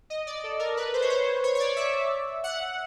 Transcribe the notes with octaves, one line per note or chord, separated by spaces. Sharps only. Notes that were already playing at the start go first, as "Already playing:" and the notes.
D#5
D5
A4
A#4
B4
C5
C#5
C5
C#5
C#5
D5
E5
F#5